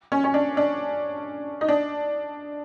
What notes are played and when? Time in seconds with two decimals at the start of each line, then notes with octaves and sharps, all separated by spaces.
0.12 C#4
0.24 C#4
0.34 D4
0.57 D4
1.61 D#4
1.68 D4